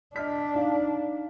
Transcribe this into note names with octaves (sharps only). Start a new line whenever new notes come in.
D4 D#5 F6 B6
D#4 F5